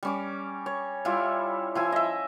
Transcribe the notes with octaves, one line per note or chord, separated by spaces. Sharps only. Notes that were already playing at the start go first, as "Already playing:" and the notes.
G3 C#4 D6
C#5
G3 E4 F4
F3 E4 G#5
D#5 E5